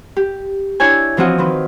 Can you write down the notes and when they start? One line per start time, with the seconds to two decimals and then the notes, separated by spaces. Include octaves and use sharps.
0.16 G4
0.80 D4 E4 C#5 E5 G5 G#5
1.17 E3 F3 C4 F4 F#4 D#5
1.38 D#3 C4 B4